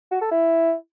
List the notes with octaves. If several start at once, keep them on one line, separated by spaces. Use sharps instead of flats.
F#4
A4
E4